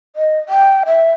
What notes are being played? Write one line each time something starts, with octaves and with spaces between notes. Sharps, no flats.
D#5
G5
E5